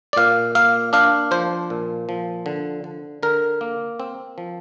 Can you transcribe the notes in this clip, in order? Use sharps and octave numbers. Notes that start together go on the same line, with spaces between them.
D5
A#2 F5
A#3 F5
D4 F5
F3 C5
A#2
F3
D3
D3
D3 A#4
A#3
C4
F3